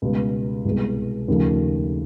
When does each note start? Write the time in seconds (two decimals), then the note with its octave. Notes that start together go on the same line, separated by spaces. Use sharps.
0.02 C#2 B2 G3
0.65 C2 B2 G#3
1.28 D#2 C#3 F3 A3